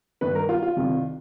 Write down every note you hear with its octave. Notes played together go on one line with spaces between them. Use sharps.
G2 D#3 B4
A#4
F4
F4
C2 C3 D#3